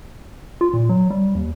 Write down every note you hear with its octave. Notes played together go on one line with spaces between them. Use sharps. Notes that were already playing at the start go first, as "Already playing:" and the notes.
F4
A#2
F#3
G3
D#2